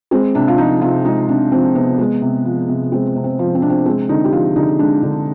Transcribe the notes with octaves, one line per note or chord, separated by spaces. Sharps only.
G#3 C4
C3 D4
F4
F3 D#4
C3 F4
G#3 D#4
C3 D4
F3 C4
C3 B3
G#3
C3
F3
C3
G#3 C4
C3
C4
F3
C4
C3 D4
C4
G#3 C4
D3 D#4
G4
F3 F4
D3 D#4
G#3 D4
D3